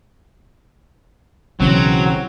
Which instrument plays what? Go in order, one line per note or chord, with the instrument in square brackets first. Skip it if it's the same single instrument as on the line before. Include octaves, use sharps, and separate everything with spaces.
[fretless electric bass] B1 C#3 E3 [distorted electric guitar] F#3 [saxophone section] C4